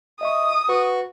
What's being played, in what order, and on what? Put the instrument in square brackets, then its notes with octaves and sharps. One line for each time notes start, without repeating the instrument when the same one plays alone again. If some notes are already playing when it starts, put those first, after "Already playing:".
[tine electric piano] D#5 E5 C#6 [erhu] D#6
[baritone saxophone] F#4 [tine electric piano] B4 C#6